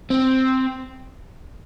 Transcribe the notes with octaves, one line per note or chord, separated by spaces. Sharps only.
C4